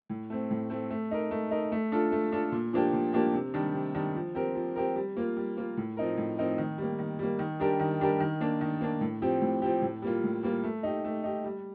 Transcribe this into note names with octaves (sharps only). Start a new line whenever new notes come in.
A2
A3 C4
A2
A3 C4
A3
D#4 A#4
A3
D#4 A#4
A3
D4 F4 A4
A3
D4 F4 A4
A#2
F3 A#3 D4 G4
A#2
F3 A#3 D4 G4
C3
D#3 G3 D4
C3
D#3 G3 D4
F3
C4 G4 A#4
F3
C4 G4 A#4
G3
A#3 F4
G3
A#3 F4
A2
F3 C4 D#4 A#4
A2
F3 C4 D#4 A#4
D#3
G3 A#3
D#3
G3 A#3
D#3
G3 D4 G4 A#4
D#3
G3 D4 G4 A#4
D#3
A#3 D4
D#3
A#3 D4
A2
F3 C4 G4
A2
F3 C4 G4
A2
G3 A#3 F4
A2
G3 A#3 F4
A3
D#4 G4
A3
D#4 G4
G3